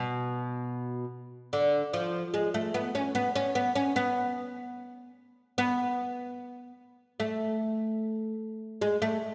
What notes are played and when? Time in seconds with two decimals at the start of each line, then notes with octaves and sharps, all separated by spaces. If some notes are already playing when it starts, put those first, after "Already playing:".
Already playing: B2
1.53 D3
1.93 F3
2.34 G#3
2.54 A3
2.74 B3
2.95 C#4
3.15 B3
3.36 C#4
3.55 B3
3.75 C#4
3.96 B3
5.58 B3
7.20 A3
8.81 G#3
9.02 A3